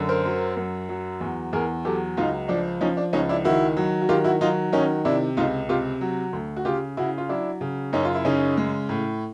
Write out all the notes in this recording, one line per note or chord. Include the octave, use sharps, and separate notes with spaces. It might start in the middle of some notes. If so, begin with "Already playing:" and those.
Already playing: F#2 D3
A#4 C5
F#3
F#2
F#3
E2
E2 G#4 A#4
F#3 G4 A4
C#2 D#4 F4
F3 D4
F3 C#4 D#4
D4
C#2 C#4 D#4
D4 E4
D#3 E4 F#4
F#3
F#4
D#3 F4 G4
E4 F#4
F#3 D#4 F4
D#3 C#4 D#4
C3 D4 E4
C#2 D#4 F4
C3 F4 G4
F#3
D2
F#4
C#3 F4 G4
C#3 E4 F#4
F4
F#3 D4 E4
C#3
F#2 C#4 D#4
F4
E4
C#3 C#4 D#4
G#3
A2